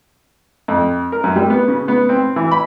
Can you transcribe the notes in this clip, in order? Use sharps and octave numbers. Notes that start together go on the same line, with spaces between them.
F2
A#4
F#2
G3
B3
C#3
B3
C4
E3
B5